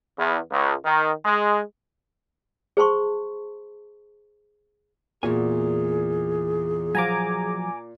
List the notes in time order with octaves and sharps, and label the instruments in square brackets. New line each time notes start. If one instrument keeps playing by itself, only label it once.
[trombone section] E2
C#2
D#3
G#3
[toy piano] G#4 C5 A5 C6 C#6
[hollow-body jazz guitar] E2 F#4 G#5 [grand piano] A#2 [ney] G#4
[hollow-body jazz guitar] F3 F#3 [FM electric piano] G#5 A#5 D6